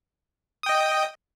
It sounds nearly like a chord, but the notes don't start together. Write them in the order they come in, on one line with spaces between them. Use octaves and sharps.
D#6 G5 D#5